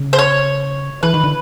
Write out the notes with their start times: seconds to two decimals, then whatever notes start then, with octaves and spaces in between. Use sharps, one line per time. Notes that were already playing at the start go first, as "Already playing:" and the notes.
Already playing: C#3
0.13 C5
0.19 C#5
1.03 E3 B4
1.14 D#3
1.24 D3